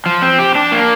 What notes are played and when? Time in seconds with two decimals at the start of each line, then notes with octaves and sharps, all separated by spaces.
0.06 F3
0.22 C4
0.39 G4
0.55 D4
0.72 A#3